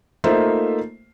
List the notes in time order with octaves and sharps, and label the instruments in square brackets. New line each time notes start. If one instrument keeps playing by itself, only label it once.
[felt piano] A3 A#3 D#4 F4 C5 E5